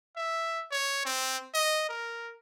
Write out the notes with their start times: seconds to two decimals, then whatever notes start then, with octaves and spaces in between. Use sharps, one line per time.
0.16 E5
0.71 C#5
1.05 C4
1.54 D#5
1.89 A#4